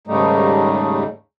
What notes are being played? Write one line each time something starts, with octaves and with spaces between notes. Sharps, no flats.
D#2 G#2 C#3 G3 A3 D#4